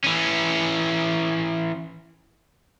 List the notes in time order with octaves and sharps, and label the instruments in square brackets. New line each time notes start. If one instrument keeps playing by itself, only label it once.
[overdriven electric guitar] E3 C#4